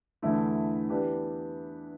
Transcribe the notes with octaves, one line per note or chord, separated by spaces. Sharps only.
E2 D3 A3 E4
E3 B3 D4 G4